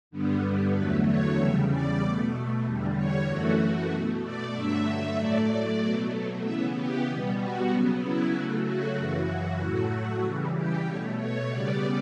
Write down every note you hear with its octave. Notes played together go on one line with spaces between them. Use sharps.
G2 D3 G3 B3
E2 D3 F#3 A3 B4
C#5
E2 C#3 G3 E5
D5
B2 A3
E2 D3 G3
C#5
F#2 E3 A3 F#4
B2 A3
D5
G2 D3 F#3 A3 E5
A2 F#3 A3 D5
D5
B2 F#3 A3 D5
C#3 E3 B3 E5
G4
B2 G3 B3
F#4
C#3 F#3 B3
E4
C#3 F#3 A3 F#4
F#4
F#2 C#3 E3 F#4
A2 F#3 A3 F#4
C#3 E3 G3
G4
B2 A3 C#5
C#5
C#3 G3 B3 D5